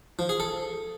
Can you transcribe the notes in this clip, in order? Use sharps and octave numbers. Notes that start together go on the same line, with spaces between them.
F3
G#4
A4